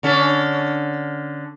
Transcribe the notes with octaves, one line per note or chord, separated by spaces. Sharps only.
D3 C#4 A4